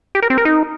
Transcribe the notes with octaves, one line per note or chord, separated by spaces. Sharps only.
G4
A#4
C4
A#4
D#4